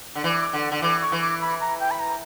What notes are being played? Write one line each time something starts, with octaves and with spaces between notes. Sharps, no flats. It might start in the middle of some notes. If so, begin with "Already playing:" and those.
D3
E3 D6
D3
D3
E3 D6
C#6
E3
D6
B5
A#5
G5
B5
A#5